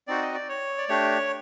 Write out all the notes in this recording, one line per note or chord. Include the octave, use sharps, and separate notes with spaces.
C4 D#4 F#4 D5
D#5
D5
C#5
D5
A3 D4 G4 C#5